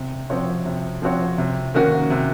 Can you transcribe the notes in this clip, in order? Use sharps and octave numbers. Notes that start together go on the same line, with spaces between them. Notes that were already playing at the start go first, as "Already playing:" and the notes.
Already playing: C3
F3 C4 F#4 C#5
C3
F3 C4 F#4 C#5
C3
D#3 A#3 C#4 F#4
C3